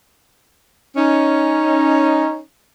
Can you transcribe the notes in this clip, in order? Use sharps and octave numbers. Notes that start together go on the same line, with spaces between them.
C#4 D#4